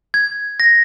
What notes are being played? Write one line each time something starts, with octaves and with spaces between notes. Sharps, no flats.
G#6
A#6